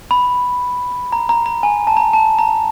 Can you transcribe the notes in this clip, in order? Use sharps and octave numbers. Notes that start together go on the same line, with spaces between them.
B5
A#5
A#5
A#5
G#5
A5
A#5
A5
A#5